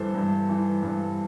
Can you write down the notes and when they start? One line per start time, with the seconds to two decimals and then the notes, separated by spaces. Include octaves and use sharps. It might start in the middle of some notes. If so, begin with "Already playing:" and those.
Already playing: G2 E3 A4 C5
0.15 G2
0.49 E3
0.83 G2